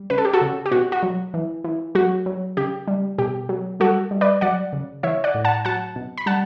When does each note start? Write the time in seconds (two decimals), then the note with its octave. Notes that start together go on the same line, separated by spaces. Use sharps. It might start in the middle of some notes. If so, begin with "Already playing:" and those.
Already playing: G3
0.10 C#3 B4
0.18 A4
0.25 G4
0.33 F#4 A4
0.41 C#3
0.66 G4
0.71 B2 F#4
0.92 F#4
1.03 F#3
1.34 E3
1.64 E3
1.95 F#3 F#4
2.26 F#3
2.57 C#3 G4
2.88 G3
3.18 B2 G4
3.49 F#3
3.80 G3 F#4 A4
4.11 G3
4.21 B4 D5
4.41 F#3 D5 F#5
4.73 C#3
5.03 E3 C#5 E5
5.24 D5 F#5
5.34 A2
5.45 F#5 A5
5.65 F#3 F#5 A5
5.96 B2
6.18 B5
6.26 G3 F#5 A5